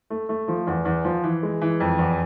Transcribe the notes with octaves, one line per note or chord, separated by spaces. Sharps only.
A3
A3
F3
E2
E2
F3
E3
G#3
E3
F2
E2